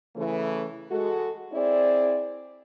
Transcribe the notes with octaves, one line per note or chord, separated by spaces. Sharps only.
C#3 E3 A3
G#3 F#4 A4
C4 E4 G#4 D5